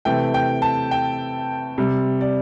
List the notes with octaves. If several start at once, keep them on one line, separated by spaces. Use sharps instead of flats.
C3 E3 A3 G5
G5
A5
G5
C3 G3
D5